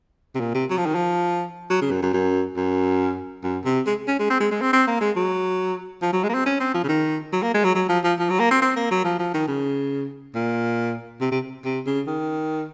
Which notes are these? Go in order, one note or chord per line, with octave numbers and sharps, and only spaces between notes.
C3
A#2
C3
F#3
F3
D#3
F3
F#3
C#3
F#2
F#2
F#2
F#2
F#2
C3
G#3
C#4
G#3
C4
G#3
G#3
C4
C4
A#3
G#3
F#3
F3
F#3
G#3
A#3
C4
C#4
C4
F3
C#3
D#3
F#3
A#3
G#3
F#3
F#3
F3
F3
F3
F#3
A#3
C4
C4
A#3
F#3
F3
F3
D#3
C#3
A#2
C3
C3
C3
C#3
D#3